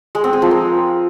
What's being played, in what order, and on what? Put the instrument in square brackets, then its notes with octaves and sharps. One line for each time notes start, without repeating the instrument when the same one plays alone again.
[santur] G#3
C4
G#4
F3
A#4